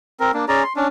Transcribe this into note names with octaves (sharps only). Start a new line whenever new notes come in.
C4 A#4
A#3 D4
C#4 G#4 D5 A#5
C6
C#4 D4